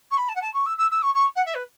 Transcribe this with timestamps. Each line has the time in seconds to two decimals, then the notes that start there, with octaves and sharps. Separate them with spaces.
0.11 C#6
0.17 B5
0.29 A5
0.35 F#5
0.42 A5
0.54 C#6
0.66 E6
0.78 E6
0.91 E6
1.02 C#6
1.14 C#6
1.36 F#5
1.46 E5
1.55 B4